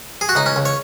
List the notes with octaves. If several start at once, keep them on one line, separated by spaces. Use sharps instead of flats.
G#4
F#4
C#2 D#4
C#4
C#2
C#5